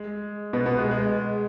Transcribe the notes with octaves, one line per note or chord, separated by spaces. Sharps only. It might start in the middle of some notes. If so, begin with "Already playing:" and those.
Already playing: G#3
B2 B3
B2 B3
G#3
G#3